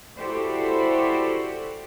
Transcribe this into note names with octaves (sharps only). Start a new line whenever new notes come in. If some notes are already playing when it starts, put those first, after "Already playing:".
E4 F#4 G4 A4 C5 D5